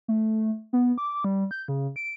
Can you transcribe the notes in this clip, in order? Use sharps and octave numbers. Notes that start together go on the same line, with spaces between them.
A3
B3
D6
G3
G6
C#3
D7